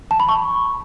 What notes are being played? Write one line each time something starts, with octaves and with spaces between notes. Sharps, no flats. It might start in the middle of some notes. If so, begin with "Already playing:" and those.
A5
B5
C#6